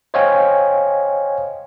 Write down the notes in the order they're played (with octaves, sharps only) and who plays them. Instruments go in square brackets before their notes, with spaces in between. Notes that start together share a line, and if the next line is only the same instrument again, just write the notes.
[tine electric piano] C5 C#5 D#5 F5 G5 G#5